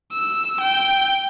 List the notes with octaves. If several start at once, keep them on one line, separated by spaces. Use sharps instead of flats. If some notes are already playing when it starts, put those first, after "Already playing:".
E6
G5